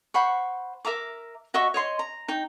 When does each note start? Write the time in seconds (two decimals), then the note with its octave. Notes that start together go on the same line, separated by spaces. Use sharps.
0.14 C5 F#5 B5 C#6
0.85 A#4 E5 A#5 D6
1.54 F#4 D#5 E5 C#6
1.74 C#5 D#5 C6
1.99 A#5
2.28 D#4 G5